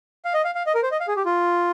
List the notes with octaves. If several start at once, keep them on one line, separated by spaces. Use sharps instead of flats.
F5
D#5
F5
F5
D#5
A#4
C5
D#5
F5
G#4
G4
F4